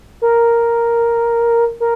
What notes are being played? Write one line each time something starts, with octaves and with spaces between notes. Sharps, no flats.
A#4
A#4